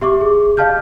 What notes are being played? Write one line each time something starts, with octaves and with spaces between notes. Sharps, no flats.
G4 E5 C#6 D6
G#4
D#5 F5 A5 F6 G6